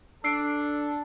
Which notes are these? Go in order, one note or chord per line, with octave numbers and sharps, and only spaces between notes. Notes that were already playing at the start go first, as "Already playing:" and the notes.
D4 A4 E6 C7 D7